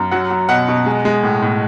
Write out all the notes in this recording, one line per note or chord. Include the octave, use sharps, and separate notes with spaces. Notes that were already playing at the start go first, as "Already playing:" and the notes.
Already playing: F#2
F#3 F#5
F#3
B2 F#5
B2
G#3
G#3
A2
A2